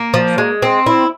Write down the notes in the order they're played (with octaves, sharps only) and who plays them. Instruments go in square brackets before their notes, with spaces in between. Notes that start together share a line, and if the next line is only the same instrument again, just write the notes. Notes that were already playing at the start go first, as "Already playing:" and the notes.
Already playing: [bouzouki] A#3
F3
G#3
C4
E4